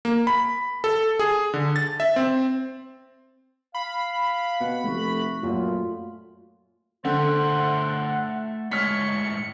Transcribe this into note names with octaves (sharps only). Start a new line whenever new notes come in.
A#3
B5
A4
G#4
D3
A6
E5
C4
F5 B5
B2 F#5
F1 A3 F#4
F#2 A#2 F4
D3 A3 C5 F#5 G5
A2 G#3 C#5 F6 B6 C#7